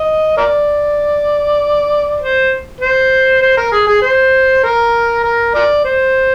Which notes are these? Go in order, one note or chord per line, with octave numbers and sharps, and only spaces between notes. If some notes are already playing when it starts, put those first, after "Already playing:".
Already playing: D#5
A#4 D5
C5
C5
C5
A#4
G#4
G#4
C5
A#4
A#4
A#4 D5
C5